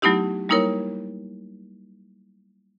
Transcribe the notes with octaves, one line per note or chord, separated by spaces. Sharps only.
F#3 A3 B3 D#4 E4 G4
G3 A#3 D#4 E4 A#4 C#5